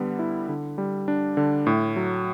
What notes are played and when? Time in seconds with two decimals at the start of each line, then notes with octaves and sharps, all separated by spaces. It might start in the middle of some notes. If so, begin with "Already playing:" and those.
Already playing: D3 G3 B3
0.19 E4
0.49 D3
0.78 G3
1.08 D4
1.37 D3
1.67 A2
1.96 F#3